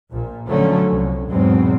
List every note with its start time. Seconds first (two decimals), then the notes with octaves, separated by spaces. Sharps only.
0.12 A#1 A#2
0.48 D3 F3 F#3 A3 C#4
0.92 C2
1.30 E2 G#2 B2 F#3 C4